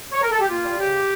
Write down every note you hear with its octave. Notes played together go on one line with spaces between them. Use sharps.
C#5
A#4
A4
G4
A#3 F4
G3
C#3 G4